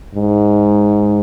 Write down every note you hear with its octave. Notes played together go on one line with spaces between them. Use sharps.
G#2